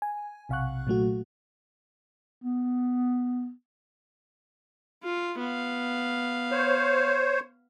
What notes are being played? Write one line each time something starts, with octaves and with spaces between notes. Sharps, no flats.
G#5
B1 C3 F5 F#5 C#6 F#6
A#2 F#3 A3 F#4
B3
F4
B3 F5
C5 C#5